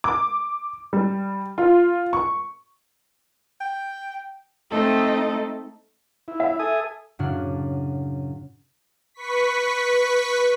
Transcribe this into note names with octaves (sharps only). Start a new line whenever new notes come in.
D6
G3
F4
C#6
G5
A3 C4 D#4 A4 D#5
E4
E5
A4 G#5 D#6
F#2 A2 C#3 D4 F#4 F6
B4 C#6 B6